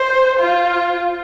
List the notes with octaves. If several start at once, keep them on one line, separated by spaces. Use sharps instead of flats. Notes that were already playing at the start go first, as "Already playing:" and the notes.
Already playing: C5
F4